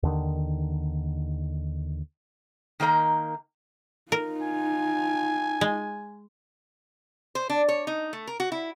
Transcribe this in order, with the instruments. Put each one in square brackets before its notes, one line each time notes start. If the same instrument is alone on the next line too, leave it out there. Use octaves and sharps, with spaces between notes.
[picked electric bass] D#2 D3 D#3
[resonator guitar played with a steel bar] D#3 A#3 D#4 B4 A#5
[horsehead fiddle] D#4 F4 [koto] A#4
[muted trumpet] G#5
[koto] G#3
[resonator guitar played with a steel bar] C5
D4
C#5
D#4
A3
A#4
F#4
E4